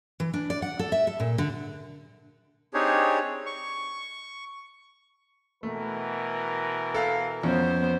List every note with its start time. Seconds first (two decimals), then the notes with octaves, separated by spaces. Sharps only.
0.20 E3
0.34 D4
0.50 D5
0.62 F#5
0.79 A4
0.92 E5
1.07 A4
1.20 A#2
1.38 D3
2.74 C4 D4 D#4 G4 G#4 C#5
3.46 C#6
5.63 B2 E3 A3 A#4
6.94 A4 F5
7.43 F2 B3 C#4 C5